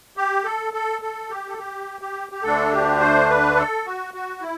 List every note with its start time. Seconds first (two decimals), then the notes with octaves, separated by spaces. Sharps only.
0.17 G4
0.44 A4
0.73 A4
1.02 A4
1.30 G4
1.48 A4
1.58 G4
2.02 G4
2.32 G4
2.43 D2 D3 A3 D4 A4
2.72 G4
3.00 C5
3.29 B4
3.56 A4
3.86 F#4
4.14 F#4
4.41 E4